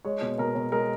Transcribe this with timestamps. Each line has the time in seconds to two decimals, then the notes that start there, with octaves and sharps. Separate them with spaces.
0.05 G#3 C#5
0.22 B2
0.38 B2 A#4
0.55 B2
0.72 G#3 A#4